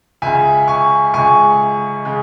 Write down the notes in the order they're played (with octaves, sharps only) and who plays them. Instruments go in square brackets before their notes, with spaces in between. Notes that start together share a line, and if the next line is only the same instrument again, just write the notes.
[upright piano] C#2 C#3 G#3 E5 G#5
G#5 C#6
C#2 C#3 G#3 G#5 C#6
C#3 G#3